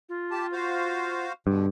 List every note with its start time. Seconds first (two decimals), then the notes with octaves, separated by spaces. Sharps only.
0.09 F4
0.31 G4 A5
0.52 F#4 C5 F5
1.47 G2 B2 D3